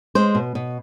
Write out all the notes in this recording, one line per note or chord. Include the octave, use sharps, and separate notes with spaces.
G#3 C5
B2
B2